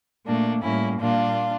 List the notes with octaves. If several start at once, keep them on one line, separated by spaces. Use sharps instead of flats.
A#2 A3 A#3 D4
A2 G3 A#3 C#4 E4
A#2 G3 A#3 D4 F4